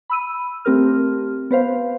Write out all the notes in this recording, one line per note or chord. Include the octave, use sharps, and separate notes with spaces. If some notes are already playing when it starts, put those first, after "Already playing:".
B5 E6 D#7
A3 C4 G4 A#4 F6
B3 B4 C5 F5